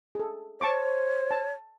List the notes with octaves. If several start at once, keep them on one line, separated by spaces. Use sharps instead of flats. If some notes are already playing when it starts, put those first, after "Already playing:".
G#4 A4
C5 C#5 A5 C#6 D6
A5